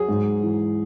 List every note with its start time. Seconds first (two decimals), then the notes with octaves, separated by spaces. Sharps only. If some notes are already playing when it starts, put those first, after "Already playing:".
Already playing: F#3 G#4
0.09 G#2
0.43 E3